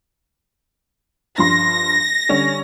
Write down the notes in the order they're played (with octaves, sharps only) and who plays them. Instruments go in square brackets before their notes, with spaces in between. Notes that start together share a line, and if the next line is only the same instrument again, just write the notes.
[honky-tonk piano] G2 F3 C6 [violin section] A#6
[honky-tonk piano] D3 G3 C#4